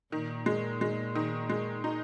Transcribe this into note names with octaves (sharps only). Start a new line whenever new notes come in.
A#2 D#3
G#3
G#3
D#3
G#3
D#4